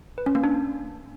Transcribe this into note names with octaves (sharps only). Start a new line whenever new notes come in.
B4
C#4
A#3
D4